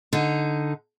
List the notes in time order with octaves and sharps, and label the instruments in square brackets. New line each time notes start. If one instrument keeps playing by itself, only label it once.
[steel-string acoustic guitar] D3 D#4